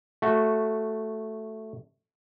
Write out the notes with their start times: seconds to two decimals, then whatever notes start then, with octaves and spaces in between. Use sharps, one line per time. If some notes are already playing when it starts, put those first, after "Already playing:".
0.22 A3 F#4